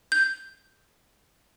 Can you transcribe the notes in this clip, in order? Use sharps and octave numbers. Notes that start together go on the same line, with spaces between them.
G6